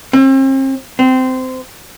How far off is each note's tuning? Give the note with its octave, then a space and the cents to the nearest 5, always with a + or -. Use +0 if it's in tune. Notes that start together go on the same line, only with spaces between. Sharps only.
C4 +40
C4 -20